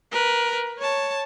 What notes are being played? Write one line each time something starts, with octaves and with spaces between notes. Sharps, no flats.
A#4 B4
C#5 A5